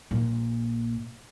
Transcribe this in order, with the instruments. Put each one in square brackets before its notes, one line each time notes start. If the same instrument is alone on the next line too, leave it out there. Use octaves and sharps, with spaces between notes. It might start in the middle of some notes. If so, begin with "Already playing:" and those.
[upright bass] A#1 A#2